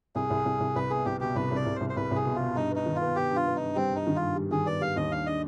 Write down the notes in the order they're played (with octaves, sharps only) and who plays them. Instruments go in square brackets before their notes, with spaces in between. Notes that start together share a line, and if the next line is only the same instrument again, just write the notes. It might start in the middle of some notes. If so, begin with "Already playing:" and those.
[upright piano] C2 [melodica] G#4
[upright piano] C2
C2
C2
[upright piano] C2 [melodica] B4
[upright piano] B3 [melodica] G#4
[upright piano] C2 [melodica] G4
[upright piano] B2 [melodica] G4
[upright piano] C2 [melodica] B4
[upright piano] C2 [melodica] D5
[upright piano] C2
[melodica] C5
[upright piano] C2
[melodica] C5
[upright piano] C2 [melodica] B4
[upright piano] C2 [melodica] G#4
[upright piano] B2
[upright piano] B2 [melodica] F4
[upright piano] G2 [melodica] D#4
[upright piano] B3 [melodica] D#4
[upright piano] D#3
[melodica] F4
[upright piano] B3
[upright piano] B3 [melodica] G4
[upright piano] G2
[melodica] F4
[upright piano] B3
[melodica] D#4
[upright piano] G2
[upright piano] G3 [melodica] C4
[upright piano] G2 [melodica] D#4
[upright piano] D#3
[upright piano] G2 [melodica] F4
[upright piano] G3
[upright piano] D#3 [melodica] G#4
[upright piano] B3 [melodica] D5
[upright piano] G3 [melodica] F5
[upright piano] D#2 [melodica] D#5
[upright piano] D4 [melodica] F5
[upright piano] D4 [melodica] D#5